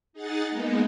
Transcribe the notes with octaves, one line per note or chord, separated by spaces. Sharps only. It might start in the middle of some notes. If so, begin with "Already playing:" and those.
D#4 G#4 F#5 A6
G#3 A#3 B3 D#4